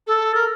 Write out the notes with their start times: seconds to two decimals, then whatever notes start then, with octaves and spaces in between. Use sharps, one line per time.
0.07 A4
0.35 A#4